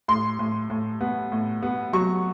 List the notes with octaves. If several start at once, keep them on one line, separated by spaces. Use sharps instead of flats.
A2 C6
A2
A2
B3
A2
B3
F#3 C#6